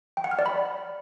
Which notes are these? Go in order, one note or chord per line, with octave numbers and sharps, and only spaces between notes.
G5
F#5
F6
D5
B5